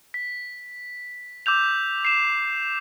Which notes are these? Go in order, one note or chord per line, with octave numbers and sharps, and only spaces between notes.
B6
D6 E6 G6 F7
C7 E7